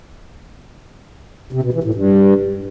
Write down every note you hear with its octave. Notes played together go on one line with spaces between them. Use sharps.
C3
B2
E3
A2
G2